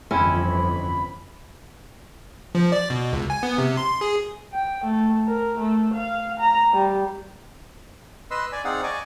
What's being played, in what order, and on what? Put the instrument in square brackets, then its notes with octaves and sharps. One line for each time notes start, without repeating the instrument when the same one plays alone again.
[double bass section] G1 F2 E3 [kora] C4 C#4 E4 [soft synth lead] B5
[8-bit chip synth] F3
D5
B2
C#2
G#5
B3
C3
C6
G#4
[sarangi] G5
A3
A#4
A3
F5
A#5
G3
[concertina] B4 D#5 C6 E6
D5 G#5
C4 D#4 G#4 D5 F5 F#5
D5 D#5 G#5 C#6 D6